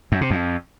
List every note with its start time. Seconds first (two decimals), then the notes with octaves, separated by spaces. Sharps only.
0.12 F#2
0.21 C3
0.31 F2